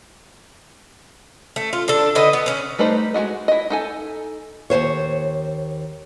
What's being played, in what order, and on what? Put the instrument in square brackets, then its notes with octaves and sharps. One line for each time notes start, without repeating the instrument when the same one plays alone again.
[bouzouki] A3
F4
D4 A4
D3 B4 D#5
B3
C#4 B4
[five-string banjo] G3 A3 D#4 B4 C5
G#3 F4 F#4 D#5
E4 D#5
D#4 A4 G#5
[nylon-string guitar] D#2 C3 C5 C#5